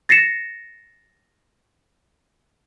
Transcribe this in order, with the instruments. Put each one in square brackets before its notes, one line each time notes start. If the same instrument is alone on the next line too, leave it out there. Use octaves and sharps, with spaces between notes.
[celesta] A6 A#6 C7 C#7 E7